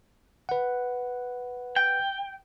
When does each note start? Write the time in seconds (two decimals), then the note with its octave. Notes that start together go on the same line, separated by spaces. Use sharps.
0.49 B4 F#5
1.76 G5